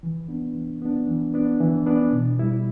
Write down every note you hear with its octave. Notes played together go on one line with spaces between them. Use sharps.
E3
B3 D4
E3
B3 D4
E3
B3 D4
E3
B3 D4
B2
G3 E4